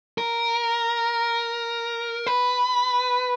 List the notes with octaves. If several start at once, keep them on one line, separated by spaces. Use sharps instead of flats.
A#4
B4